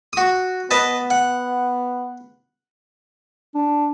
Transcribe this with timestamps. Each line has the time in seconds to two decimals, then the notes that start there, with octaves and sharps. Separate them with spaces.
0.13 F#4 D#6
0.71 B3 B4 D#5 A5
1.10 F#5
3.55 D4